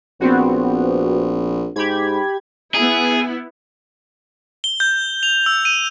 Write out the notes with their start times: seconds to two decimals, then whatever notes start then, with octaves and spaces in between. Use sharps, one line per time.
0.21 A#1 B3 C4 F#4
1.76 G#2 G4 B5 G#6
2.75 B3 E4 G#4
4.64 G7
4.80 G6
5.23 F7
5.46 E6
5.65 D#7